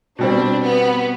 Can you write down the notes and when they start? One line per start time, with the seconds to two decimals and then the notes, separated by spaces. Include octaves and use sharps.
0.19 B2 G3 C4 D4
0.63 B3